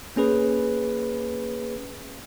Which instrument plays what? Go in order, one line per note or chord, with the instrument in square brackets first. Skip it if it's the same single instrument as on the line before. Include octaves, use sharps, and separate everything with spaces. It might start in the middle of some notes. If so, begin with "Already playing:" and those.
[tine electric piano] A#3 C#4 G#4 B4